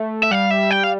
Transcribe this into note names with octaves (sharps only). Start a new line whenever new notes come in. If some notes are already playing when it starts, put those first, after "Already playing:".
Already playing: A3
E5
G3 F5
E5
G5
F5